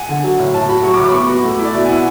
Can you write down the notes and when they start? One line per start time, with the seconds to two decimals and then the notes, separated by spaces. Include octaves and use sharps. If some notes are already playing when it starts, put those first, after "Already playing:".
Already playing: F#5 G#5
0.09 D3
0.24 F#3
0.39 A2
0.54 A2 A5
0.69 F#4 B5
0.83 F#3 C#6
0.94 D6
0.99 A2
1.04 D6
1.09 B5
1.13 B3 C#6
1.29 F#4
1.45 A3
1.59 E4
1.65 D5
1.74 B2 E5
1.85 G#5
1.89 E4 F#5